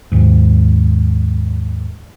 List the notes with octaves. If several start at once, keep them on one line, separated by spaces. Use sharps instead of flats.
D#2 G#2